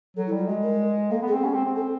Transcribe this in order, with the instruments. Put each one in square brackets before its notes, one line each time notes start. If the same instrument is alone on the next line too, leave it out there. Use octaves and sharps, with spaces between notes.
[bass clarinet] F#3 [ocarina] A4
[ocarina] E4
[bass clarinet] G3
[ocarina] F4
[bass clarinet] G#3 [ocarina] F#4
[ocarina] A#4
[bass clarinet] A#3 [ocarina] A4
[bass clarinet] B3
[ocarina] G#4
[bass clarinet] C4
[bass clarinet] C#4 [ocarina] G4
[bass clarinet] C4
C4
[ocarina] A4